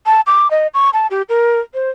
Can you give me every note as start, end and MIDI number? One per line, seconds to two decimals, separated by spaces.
0.06 0.21 81
0.27 0.50 86
0.51 0.67 75
0.74 0.90 85
0.94 1.07 81
1.11 1.22 67
1.29 1.60 70
1.74 1.90 72